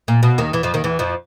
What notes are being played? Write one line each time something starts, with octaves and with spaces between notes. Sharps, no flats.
A#2
B2
D#2 D#3
E2 E3
F2 F3
D#2 D#3
E2 E3
F2 F3